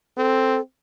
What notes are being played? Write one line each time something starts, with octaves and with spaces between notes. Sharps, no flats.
C4 A4